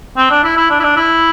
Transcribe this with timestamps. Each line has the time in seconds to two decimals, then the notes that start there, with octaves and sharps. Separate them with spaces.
0.17 C4
0.30 D4
0.44 E4
0.57 E4
0.70 D4
0.80 E4
0.83 D4
0.97 E4